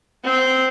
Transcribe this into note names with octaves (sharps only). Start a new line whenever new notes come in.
C4